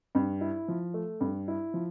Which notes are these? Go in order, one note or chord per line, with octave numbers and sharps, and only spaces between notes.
G2
E4
F3
A3
G2
E4
F3